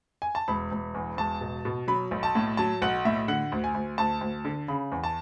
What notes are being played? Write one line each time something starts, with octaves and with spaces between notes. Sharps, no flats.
G#5
A5
E1 B5
E1
E2
E1 A5
B2
B2
F#3 B5
B1
A5
A2
F#3 A5
B1 F#5
A2 E5
D3 F#5
D2
G#5
D2
D2 A5
D2
D3
C#3 B5
E2
A5